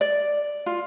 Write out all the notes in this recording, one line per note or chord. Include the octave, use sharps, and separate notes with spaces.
D5
F4